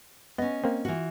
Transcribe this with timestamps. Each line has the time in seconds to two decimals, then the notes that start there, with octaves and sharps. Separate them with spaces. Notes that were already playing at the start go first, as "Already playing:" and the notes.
0.38 B3 C#4 D#5
0.64 A#3 C4
0.85 E3 F4 F#4